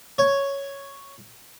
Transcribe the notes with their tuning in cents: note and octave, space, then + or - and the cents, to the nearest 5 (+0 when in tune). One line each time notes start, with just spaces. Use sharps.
C#5 +0